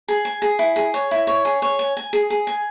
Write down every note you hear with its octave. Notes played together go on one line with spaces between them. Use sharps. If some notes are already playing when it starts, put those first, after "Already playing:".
G#4
G#5
G#4
E4
G#4
C#5
E4
C#5
G#4
C#5
G#5
G#5
G#4
G#4
G#5